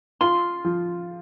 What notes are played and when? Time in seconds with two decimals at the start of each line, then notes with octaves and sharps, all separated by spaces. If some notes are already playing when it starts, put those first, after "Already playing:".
0.21 F4 C6
0.65 F3